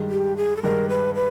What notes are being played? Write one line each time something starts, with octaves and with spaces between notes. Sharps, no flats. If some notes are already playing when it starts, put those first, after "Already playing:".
Already playing: G2 D#3 G#3
G4
G#4
A4
G2 D#3 G#3 A#4
B4
B4